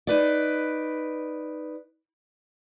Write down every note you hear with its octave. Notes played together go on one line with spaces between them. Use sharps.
D#4 B4 D5